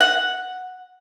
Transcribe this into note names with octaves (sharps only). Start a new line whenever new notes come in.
F#5